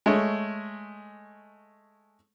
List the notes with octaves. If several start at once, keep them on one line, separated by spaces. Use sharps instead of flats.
G#3 A3 C#5